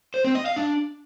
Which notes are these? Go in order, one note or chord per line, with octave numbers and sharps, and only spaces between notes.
C5
C4
D#5
F5
D4